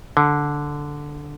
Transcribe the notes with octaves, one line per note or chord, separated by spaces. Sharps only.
D3